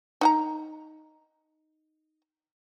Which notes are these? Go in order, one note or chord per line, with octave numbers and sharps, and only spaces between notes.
D#4 F#5 A#5